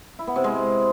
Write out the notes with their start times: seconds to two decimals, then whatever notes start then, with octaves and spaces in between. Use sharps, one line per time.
0.19 E4
0.27 B3
0.36 C3
0.44 G#3